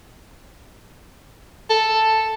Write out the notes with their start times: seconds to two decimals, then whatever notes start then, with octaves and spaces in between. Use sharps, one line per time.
1.70 A4